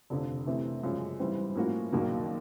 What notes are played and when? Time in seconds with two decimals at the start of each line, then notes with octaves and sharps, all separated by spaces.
0.10 F1 F2 D3
0.46 C3 E3 A3
0.83 F#2 C#3 F3 G#3
1.20 G#2 E3 G3 C4
1.55 A2 F3 A#3 C#4 F#4
1.92 E1 D#2 D#3 F#3 A#3